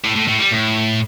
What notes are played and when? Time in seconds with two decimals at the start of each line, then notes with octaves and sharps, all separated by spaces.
0.05 A2
0.16 A2
0.28 A2
0.40 G3
0.52 A2